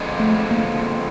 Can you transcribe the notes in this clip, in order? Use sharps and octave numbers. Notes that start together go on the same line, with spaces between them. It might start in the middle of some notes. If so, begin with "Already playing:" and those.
Already playing: F2 D3 F3 G#3 B3
A3
A#3